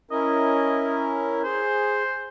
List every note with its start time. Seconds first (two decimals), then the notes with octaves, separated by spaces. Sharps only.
0.11 C#4 E4 A#4 D#5
1.44 G#4 C5